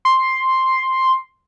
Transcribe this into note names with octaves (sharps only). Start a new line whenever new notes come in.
C6